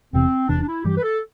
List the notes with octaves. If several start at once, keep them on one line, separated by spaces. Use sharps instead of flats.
E1 E2 C3 E3 C4
E1 E2 C3 E3 D4
D4
E4
G2 E3 G3 G4
B4
A4